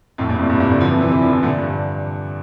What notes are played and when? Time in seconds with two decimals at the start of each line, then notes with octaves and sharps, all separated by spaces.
0.18 F2 A2
0.29 G2 A#2
0.39 A2 C3
0.49 G2 A#2
0.60 G2 A#2
0.70 A#2 D3
0.81 D3 F3
0.90 C3 E3
1.01 C3 E3
1.12 C3 E3
1.22 D3 F3
1.32 C3 E3
1.42 A#2 D3
1.58 G2